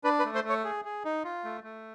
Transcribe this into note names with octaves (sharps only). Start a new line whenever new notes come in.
D4 B4
B4
A3
C5
A3 C#5
G#4
G#4
D#4
F4
A3
A3